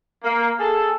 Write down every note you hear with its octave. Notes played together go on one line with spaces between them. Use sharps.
A#3
G#4 A4